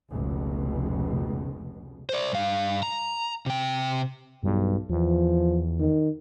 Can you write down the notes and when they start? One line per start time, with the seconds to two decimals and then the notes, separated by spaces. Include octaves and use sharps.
0.10 F1 C#2 B2
2.09 C5 D5
2.32 G2 F5
2.83 A#5
3.46 C3 G5
4.43 B1 G2
4.90 E2 F3
5.79 D#3